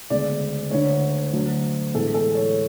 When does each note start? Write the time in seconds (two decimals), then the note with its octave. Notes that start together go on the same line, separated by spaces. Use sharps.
0.10 D2 C#3 G#3 B3 D5
0.71 D2 D3 A3 C#5
1.33 D2 D3 F#3 A3
1.94 A1 A2 G#3 B3 A4
2.14 A4
2.35 C#5